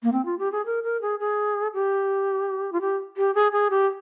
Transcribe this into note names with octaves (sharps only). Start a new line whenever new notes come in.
A#3
C4
F4
G4
G#4
A#4
A#4
G#4
G#4
G4
F4
G4
G4
G#4
G#4
G4